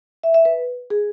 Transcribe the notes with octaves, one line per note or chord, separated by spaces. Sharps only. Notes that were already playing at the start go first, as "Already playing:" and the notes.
E5
E5
B4
G#4